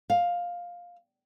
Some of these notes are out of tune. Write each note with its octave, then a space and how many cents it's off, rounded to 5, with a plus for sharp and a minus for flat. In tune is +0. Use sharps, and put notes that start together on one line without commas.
F5 +10